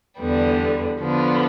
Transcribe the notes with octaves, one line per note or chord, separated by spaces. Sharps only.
E2 D3 G3 B3
D3 F3 B3 D4